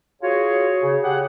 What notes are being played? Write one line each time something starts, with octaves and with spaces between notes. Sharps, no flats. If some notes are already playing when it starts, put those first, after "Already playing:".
F4 F#4 G#4 C#5
C#3
G4 G#4 F#5